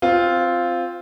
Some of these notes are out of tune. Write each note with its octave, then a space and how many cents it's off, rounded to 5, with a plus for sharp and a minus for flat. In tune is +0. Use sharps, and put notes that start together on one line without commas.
C4 +0 F4 +0